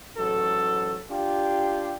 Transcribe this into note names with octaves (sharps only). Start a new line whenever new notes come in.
A1 G#2 F#3 F#4 A4
D4 F4 G4